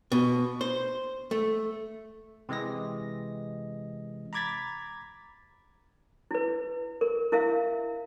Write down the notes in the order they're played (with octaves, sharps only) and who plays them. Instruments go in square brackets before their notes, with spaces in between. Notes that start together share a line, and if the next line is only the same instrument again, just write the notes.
[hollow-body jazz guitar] B2
C5
A3
[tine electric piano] C3 E3 G#3 D#5 A#6
A#5 B5 D6 G#6 A6 B6
[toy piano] E4 B4
A#4
E4 A#4 E5 F5